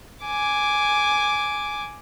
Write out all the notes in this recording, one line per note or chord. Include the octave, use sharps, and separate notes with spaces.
G#5 D6